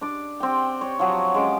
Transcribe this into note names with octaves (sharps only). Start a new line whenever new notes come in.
D4 D5
C4 G5
C#5
F3 F#3
G#3 C#4 D6